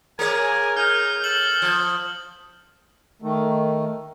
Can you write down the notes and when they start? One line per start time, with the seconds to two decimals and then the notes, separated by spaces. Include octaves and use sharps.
0.19 A#3 G#4 A#4 C#5 G#5
0.77 D#4 F6 G6
1.24 A4 F#7
1.62 F3
3.22 D#3 A3